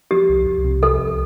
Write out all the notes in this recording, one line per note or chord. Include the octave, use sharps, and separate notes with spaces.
F3 G4
C2
C2
C3
F3 A4
C2